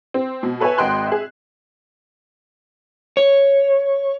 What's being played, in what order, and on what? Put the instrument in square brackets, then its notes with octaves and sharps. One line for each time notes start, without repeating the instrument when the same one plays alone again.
[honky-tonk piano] C4
B2
A4 B4 C#5 E5 G#5
G#1 F#4 D#5 G5 C6 F#6
G#4 E5
[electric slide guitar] C#5